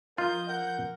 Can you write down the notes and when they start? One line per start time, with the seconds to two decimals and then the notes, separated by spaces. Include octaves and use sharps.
0.18 F3 F4 A#4 D#5 G6
0.48 A#4 F#5